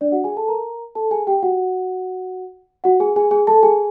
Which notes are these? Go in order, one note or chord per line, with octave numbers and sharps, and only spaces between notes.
D4 D5
F#4 F#5
G#4 G#5
A4 A5
A#4 A#5
A4 A5
G#4 G#5
G4 G5
F#4 F#5
F#4 F#5
G#4 G#5
G#4 G#5
G#4 G#5
A4 A5
G#4 G#5